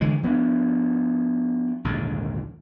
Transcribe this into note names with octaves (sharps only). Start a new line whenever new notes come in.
D3 E3 G#3
F3 B3 C4 D4
A#1 D#2 G#2 D3